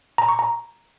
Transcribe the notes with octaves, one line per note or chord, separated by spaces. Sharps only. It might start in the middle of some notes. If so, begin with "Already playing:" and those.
A#5
C#6
A#5